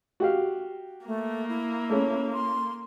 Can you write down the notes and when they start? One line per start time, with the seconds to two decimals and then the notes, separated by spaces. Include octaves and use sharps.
0.20 F#4 G4 F5
1.06 A3 A#3
1.49 E4
1.90 A3 C#4
2.33 C6